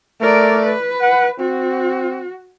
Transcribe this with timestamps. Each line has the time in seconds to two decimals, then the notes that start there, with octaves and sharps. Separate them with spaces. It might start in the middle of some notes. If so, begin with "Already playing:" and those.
0.21 A3 A#4 D5
0.65 B4
1.02 F#5
1.39 C4 F#4